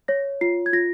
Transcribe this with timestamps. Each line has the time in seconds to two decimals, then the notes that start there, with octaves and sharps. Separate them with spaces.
0.08 C#5 A#6
0.41 F4 C7
0.66 G#6
0.73 F4 A#6